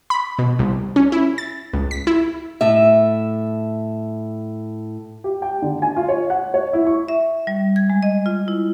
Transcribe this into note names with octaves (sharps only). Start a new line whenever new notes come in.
B5
B2
C2
C#4
E4
A6
C#2
B6
E4
A2 E5
G4
G5
D3
G#5
F4
C#5
F#5
C#5
E4
C#6
E5
G3
G#6
G#3
D#5
F4
E4